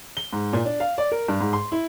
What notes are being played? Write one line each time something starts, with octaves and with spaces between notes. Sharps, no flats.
G7
G#2
A#2
D4
F5
D5
A#4
G2
G#2
C6
E4